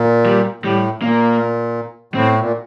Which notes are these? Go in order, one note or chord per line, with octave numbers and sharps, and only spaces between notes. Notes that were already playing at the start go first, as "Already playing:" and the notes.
Already playing: A#2
G3
A2 G3
A#2 A#3
A2 C4
A#2